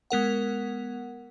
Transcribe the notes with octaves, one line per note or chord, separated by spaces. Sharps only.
G#3 B3 A#4 F#5